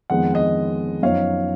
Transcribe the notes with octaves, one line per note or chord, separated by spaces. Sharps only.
F2 D#3 G#3 B3 F#5
D#5 F#5
F#2 F3 B3 D#4 C#5 F5